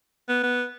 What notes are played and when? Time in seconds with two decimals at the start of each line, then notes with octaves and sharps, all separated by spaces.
0.29 B3
0.43 B3